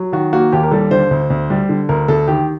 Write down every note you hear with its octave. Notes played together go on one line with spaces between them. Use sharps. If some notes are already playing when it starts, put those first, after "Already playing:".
Already playing: F#3
D#3 F#4
A#3 F#4
D#2 G4
A#4
G3 A4
D3 C5
D2
D2
G3
D3
D2 A#4
D2 A4
D#3 G4